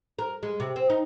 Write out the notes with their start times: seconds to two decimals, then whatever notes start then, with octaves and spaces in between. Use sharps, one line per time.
0.19 A#4
0.43 G#3
0.60 C3
0.76 C4
0.90 D#4